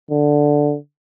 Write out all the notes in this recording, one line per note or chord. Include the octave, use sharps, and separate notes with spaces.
D3